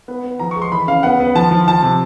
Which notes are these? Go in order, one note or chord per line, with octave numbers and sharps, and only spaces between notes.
B3
B3
F3 A#5
C#6
G#3
C6
E3 B5
C#3 F5
B3 F#5
B3
F3 A5
F3
F3 A5
C3